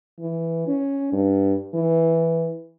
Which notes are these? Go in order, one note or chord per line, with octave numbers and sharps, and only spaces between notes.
E3
C#4
G2
E3